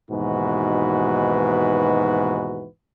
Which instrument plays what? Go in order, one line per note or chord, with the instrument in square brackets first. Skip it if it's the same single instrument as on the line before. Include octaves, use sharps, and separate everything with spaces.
[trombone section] D#2 G#2 B2 E3 F#4 B4